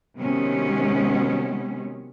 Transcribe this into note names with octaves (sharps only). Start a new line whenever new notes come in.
C3 D#3 F#3 G#3 B3 C#4